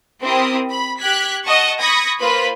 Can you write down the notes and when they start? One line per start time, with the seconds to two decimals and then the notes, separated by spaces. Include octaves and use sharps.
0.22 C4 E4 G4 A#4 D#6
0.70 B5
1.00 G4 F#6 G#6 B6
1.45 D#5 F#5 A5 C#6
1.79 B5 C#6 D#6 G#6 A#6
2.20 A#3 F4 B4 C5 B5